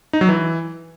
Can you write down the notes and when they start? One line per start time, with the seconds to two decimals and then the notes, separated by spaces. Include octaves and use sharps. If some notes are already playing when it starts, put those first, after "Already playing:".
0.13 D#4
0.21 F#3
0.29 E3